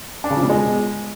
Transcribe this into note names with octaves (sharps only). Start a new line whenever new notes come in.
D4
C#3
F3
B2
G#3